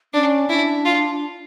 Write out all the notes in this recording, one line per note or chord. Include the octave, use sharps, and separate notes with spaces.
C#4 D4
D4 E4
F4